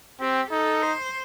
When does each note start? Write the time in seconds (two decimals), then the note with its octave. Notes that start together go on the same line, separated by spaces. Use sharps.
0.20 C4 G4
0.51 D#4 A4
0.82 C5